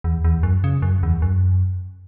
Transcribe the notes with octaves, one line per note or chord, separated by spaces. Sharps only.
E2
E2
F#2
C#3
F#2
E2
F#2